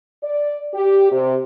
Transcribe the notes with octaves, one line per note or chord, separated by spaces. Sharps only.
D5
G4
C3